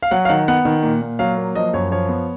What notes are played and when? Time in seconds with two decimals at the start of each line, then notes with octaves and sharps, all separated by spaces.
0.02 F5
0.11 F#3 F#5
0.25 F5
0.29 D#3 F#5
0.48 B3 F#5
0.65 D#3
0.83 A#2
1.02 A#2
1.19 F#3 F5
1.37 A#3
1.55 F3 D#5
1.73 F#2 C#5
1.91 F3 C#5
2.09 B3